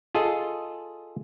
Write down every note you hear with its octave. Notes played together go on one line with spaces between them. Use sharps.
F4 G#4 A4 D#5